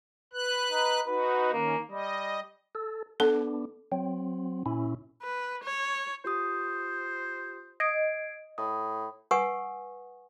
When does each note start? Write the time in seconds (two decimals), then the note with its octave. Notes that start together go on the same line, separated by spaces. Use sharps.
0.33 B4 F#6
0.72 D#4
1.07 D#4 F#4 B4
1.52 D#3 A#3 C#4
1.91 G3 D#5
2.75 A4
3.20 B3 D4 A4
3.92 F#3 C4
4.66 A#2 C#4 E4
5.23 B4
5.64 C#5
6.25 F4 G4 C5 D#6
7.80 D#5 G#6 C7 D7
8.58 A2 D#6
9.31 B4 F#5 G#5 C#6 D#6